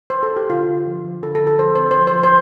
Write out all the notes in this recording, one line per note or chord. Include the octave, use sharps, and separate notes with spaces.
C5
A4
G4
D3 F4
D3
F3
F3
D3 A4
A4
D3
A4
F3 C5
C4 C5
C5
F3
C5
F3
C5